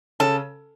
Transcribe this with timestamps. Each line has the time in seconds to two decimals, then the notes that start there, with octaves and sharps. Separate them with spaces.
0.20 C#3 C#4 A4